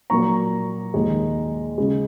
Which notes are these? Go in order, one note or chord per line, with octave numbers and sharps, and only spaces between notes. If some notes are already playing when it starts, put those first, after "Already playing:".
A#2 F#3 A#3 A#5 C#6
D#2 D#3 G#3
C#3 G#3